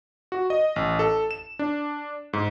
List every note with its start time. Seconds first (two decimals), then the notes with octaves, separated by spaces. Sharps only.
0.32 F#4
0.50 D#5
0.76 A1
0.99 A4
1.31 E7
1.59 D4
2.33 G#2